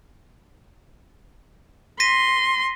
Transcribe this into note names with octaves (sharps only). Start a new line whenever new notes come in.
C6 A#6 B6 D#7